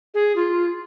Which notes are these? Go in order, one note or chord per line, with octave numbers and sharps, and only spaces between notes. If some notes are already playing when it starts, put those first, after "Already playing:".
G#4
F4